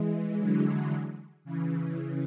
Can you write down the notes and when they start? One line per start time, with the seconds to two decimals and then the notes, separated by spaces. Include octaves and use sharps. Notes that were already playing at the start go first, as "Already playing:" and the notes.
Already playing: E3 G#3
0.38 D3 F#3
1.45 C#3 E3